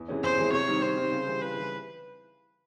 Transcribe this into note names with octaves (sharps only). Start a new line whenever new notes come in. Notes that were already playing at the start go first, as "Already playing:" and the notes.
Already playing: E2
C3 E3 G#3 C#4
E2 C5
C3 E3 G#3 C#4
C3 C#5
D#3 G3 C4
C3 C5
D#3 G3 C4
C#3
E3 G3
C#3 B4
E3 G3